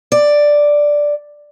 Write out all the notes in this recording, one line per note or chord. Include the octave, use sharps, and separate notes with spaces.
D5